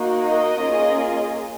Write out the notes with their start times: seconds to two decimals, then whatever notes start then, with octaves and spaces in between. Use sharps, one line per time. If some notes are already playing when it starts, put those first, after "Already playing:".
Already playing: A#3 D#4 F#4
0.22 D#5
0.60 A#3 C#4 F4 G#4